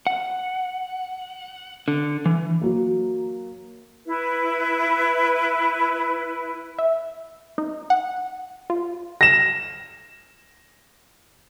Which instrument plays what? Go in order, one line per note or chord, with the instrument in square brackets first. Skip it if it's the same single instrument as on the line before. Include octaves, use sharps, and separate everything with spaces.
[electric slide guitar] F#5
D3
E3
[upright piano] F#3 A#3
[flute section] E4 B4
[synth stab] E5
D#4
F#5
F4
[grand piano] A#6 E7